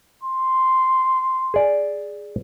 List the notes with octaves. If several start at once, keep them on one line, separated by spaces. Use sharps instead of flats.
C6
G#4 D5